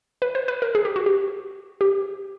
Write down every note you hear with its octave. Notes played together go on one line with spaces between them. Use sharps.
B4
C5
B4
A#4
G#4
G4
F#4
G4
G4